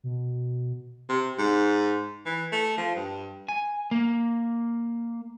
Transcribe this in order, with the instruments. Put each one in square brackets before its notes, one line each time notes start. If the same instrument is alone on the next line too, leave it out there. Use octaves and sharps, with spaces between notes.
[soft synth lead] B2
[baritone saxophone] C3
G#2
E3
A3
F3
G2
[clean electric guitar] G#5
A#3